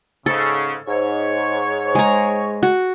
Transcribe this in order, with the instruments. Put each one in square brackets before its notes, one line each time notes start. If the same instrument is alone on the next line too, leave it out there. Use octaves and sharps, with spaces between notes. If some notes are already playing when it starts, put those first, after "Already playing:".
[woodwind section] G#2 C#3 [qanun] A4
[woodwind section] G#2 C#5
[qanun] G#3 A#5
F#4